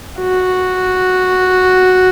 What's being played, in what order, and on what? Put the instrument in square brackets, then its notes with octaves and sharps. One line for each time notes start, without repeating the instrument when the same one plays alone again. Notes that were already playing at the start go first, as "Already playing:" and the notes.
[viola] F#4